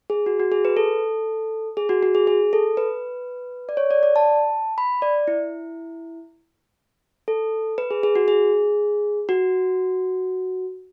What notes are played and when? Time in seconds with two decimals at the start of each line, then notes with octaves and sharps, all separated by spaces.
0.10 G#4
0.26 F#4
0.40 F#4
0.52 G#4
0.65 B4
0.77 A4
1.77 G#4
1.89 F#4
2.03 F#4
2.15 G#4
2.27 G#4
2.53 A4
2.77 B4
3.69 D5
3.77 C#5
3.91 D5
4.03 D5
4.16 A5
4.78 B5
5.02 D5
5.28 E4
7.28 A4
7.78 B4
7.91 G#4
8.03 G#4
8.15 F#4
8.28 G#4
9.29 F#4